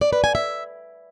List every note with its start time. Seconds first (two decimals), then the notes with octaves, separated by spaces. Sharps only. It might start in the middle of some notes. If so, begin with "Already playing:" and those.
0.01 D5
0.13 B4
0.24 G#5
0.35 E5